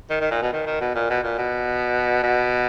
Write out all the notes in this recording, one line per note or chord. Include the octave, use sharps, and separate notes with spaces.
D#3
D#3
A#2
B2
D#3
D#3
B2
A#2
B2
A#2
B2
B2